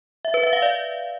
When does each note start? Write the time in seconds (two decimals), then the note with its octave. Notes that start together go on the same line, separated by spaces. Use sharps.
0.25 E5
0.34 B4
0.43 E5
0.53 F5
0.62 D5